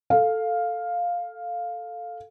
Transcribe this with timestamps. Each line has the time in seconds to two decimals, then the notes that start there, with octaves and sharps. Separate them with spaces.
0.10 A4 F5